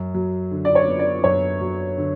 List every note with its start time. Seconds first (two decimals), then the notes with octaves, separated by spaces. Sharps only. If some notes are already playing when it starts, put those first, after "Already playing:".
Already playing: F#2
0.14 F#3
0.51 D3
0.65 D5
0.75 C#5
0.88 B3
0.99 D5
1.24 F#2 C#5
1.61 F#3
1.98 D3